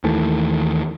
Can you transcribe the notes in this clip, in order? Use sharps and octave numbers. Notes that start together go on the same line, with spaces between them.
D#2 D#3 E3 A3